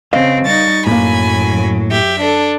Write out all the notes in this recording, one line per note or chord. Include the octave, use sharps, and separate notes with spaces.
C#3 C4 B4 D#5 F5
G3 D#4 C#6 A6
F#2 A2 F#3 A#3 G#5 B5
G4 E5
D4 A4